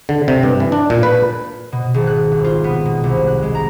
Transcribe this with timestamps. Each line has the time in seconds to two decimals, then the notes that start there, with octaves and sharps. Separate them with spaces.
0.09 D3
0.28 C3
0.43 G2
0.60 E3
0.72 D4
0.90 A#2
1.03 B4
1.72 B2
1.94 G#1
2.07 F#6
2.32 C2
2.45 F4
2.64 B3
2.85 B2
3.04 C2
3.27 F#6
3.42 G#3
3.55 A#5